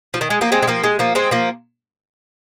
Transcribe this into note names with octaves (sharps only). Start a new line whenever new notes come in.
F3
D#3
G#3
F3 A#3
G#3 C4
G#3
F3 A#3
G#3
F3 A#3
G#3 C4
F3 A#3